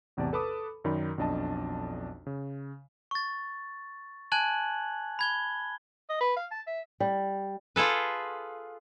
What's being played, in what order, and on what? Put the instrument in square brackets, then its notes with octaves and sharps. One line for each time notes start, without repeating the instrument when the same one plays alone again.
[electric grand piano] A1 E2 C3 D5 A5
A4 B4 A5 B5 D6 D#6
F#2 D#3 D#4 D5 B5
B1 F2 D4 D#5 A5
C#3
[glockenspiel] C#6 A6
G#5 A5 F#6 G#6 F#7
B5 G#6 G7
[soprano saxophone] D#5
B4
F5
A5
E5
[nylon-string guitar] G3
[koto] F4 G#4 A4 B4